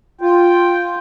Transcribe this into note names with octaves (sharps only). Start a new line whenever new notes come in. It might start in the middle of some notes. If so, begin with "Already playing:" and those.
F4 G5